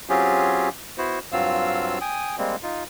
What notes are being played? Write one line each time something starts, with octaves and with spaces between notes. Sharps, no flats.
F#3 C4 C#4 F4 G4 G#4
B3 E4 F#4 C5
G2 F#3 C4 F4 F5 E6
G5 G#5 D#6
G3 G#3 A#3 C4
D#4 F4